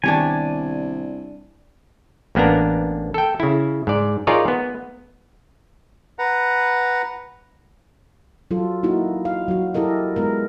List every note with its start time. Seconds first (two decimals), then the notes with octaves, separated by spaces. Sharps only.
0.04 C2 D#3 B3 D4 G4 C#5 G#5
2.35 A1 A#3 B3 D4 A#5
3.14 A4 G5
3.40 C#3 E4
3.87 G#2 D5
4.27 D#4 F4 G#4 A#4 C#5 D5
4.48 B3
6.19 B4 F#5 A#5
8.51 F#3 F4 A4
8.83 A#3 D#4 E4 F#4
9.25 F5
9.48 F#3 F#4
9.74 E4 G4 A4 A#4 D#5
10.16 G#3 B3 A#4